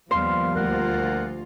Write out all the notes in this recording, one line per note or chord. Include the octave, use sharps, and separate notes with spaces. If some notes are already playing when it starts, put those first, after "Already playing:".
D#2 F3 G3 A#3 B3 C5 F5
D2 F4 A#4 F#5